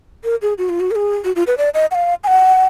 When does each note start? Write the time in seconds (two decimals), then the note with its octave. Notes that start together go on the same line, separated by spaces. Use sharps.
0.24 A#4
0.42 G#4
0.58 F#4
0.69 F4
0.80 F#4
0.91 A#4
0.95 G#4
1.24 F#4
1.36 F4
1.47 B4
1.58 D5
1.74 D#5
1.91 F#5
1.95 F5
2.24 G#5
2.27 F#5